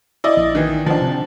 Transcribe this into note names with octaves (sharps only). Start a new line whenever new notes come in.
E4 D5 D#5
A#1
D#3 E3
D#3 F3 D4
C3